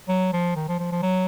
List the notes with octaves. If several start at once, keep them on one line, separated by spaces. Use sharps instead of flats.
F#3
F3
D#3
F3
F3
F3
F#3